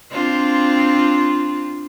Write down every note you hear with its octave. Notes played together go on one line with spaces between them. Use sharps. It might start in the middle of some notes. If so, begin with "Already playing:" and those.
C4 D4 F4